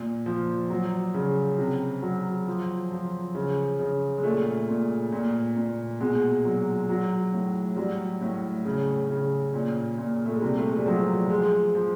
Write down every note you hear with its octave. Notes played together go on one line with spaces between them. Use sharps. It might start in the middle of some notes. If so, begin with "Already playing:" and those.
Already playing: A#2
F3
F#3
C#3
C3
F#3
F3
F3
C#3
C#3
G#3
A#2 A3
A#2
A#2
A#2
B2 G#3
F#3
F#3
A2
F#3 G3
A2
C#3
C#3
A#2
A#2
A3
G#3
C3 G3
A3
G#3
G3
F3 F#3
G3
F3 G#3
F3